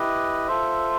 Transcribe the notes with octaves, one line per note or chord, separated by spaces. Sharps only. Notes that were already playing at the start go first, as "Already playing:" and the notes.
Already playing: E4 G4 B4 D#5
F4 A4 C5 E5